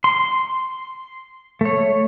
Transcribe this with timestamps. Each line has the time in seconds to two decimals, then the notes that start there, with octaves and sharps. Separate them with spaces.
0.04 C6
1.61 A3 C#5